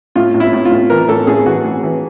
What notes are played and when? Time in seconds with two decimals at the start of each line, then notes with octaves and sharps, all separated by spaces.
0.16 A2 F4
0.34 A2
0.40 E4
0.53 A2
0.65 F4
0.71 A2
0.90 E3 A#4
1.08 A2 A4
1.27 A2 G#4
1.46 E3 F#4
1.64 A2
1.83 E3